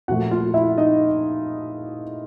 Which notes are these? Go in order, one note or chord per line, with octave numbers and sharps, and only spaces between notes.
A#2 F3 A3 F#4 F#5
F4 F5
E4 E5
D#4 D#5